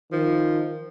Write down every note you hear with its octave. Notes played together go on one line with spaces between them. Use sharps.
D#3 F3